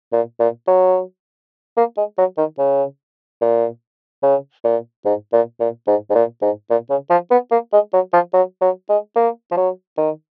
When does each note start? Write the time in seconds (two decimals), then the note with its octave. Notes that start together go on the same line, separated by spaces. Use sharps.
0.13 A#2
0.40 A#2
0.68 F#3
1.77 A#3
1.97 G#3
2.18 F#3
2.38 D#3
2.59 C#3
3.42 A#2
4.23 C#3
4.64 A#2
5.05 G#2
5.33 A#2
5.60 A#2
5.87 G#2
6.10 G#2
6.15 A#2
6.42 G#2
6.70 A#2
6.90 C#3
7.11 F3
7.31 B3
7.51 A#3
7.73 G#3
7.93 F#3
8.13 F3
8.33 F#3
8.61 F#3
8.89 G#3
9.16 A#3
9.52 F3
9.57 F#3
9.98 D#3